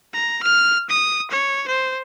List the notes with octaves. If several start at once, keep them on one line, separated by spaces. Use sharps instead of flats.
A#5
F6
D#6
C#5
C5